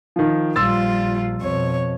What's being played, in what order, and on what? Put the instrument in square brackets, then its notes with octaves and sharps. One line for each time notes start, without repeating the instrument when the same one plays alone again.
[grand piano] D#3 F3
[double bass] A#1 [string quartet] G3 F4 [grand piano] C6 E6 A6
[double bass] F2 B2 [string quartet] C#5